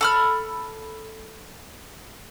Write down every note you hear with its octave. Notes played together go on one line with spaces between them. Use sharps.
A4 B5 F6